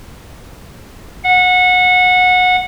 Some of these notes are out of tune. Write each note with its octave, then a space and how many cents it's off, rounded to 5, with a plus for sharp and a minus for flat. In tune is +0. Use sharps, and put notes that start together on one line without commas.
F#5 -20